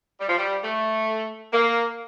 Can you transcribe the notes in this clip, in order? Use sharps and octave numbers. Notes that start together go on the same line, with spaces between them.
G3
F3
G3
A3
A#3